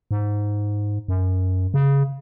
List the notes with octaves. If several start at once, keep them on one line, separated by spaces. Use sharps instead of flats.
G#2
F#2
C#3